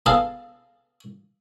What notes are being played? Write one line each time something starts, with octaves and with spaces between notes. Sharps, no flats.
B3 G#4 A4 F5 A5